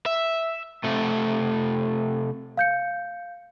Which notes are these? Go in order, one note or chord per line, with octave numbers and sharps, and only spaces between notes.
E5
C3 A3
F5 G6 C#7